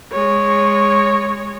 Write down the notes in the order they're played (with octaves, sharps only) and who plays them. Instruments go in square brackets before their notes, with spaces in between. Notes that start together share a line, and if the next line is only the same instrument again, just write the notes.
[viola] G#3 C#5